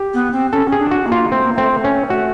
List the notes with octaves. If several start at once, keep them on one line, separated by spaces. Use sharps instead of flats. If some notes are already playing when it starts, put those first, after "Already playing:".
Already playing: G4
B3
C4
C#4 A4
C#4
G#4
D4
F#4
A#3
F4
A3 C4
A#3
A3 C4
A3
C#4
A3 F#4